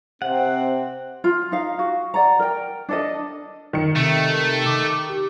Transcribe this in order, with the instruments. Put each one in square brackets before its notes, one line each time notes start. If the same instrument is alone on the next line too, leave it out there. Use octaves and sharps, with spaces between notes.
[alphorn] C3 [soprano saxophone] C4 [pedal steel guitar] F#5
[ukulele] F4
D#4 F5
F#4
D5 F#5 A#5
A#4 G5
D4 A4 D#5
[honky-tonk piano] D#3 C#7
[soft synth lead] C3 [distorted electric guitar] A3
[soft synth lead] D6
G4